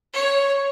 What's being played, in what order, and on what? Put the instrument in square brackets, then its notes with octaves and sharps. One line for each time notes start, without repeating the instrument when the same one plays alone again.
[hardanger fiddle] C#5